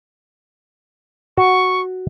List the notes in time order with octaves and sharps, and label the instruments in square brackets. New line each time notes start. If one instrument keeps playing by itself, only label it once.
[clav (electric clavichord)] F#4 [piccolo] C#6